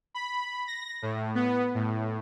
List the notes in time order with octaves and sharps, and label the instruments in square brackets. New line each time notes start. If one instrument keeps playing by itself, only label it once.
[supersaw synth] B5
A#6
A2
B3
A2